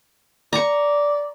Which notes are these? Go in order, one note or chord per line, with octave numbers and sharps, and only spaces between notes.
D5 A#5 C#6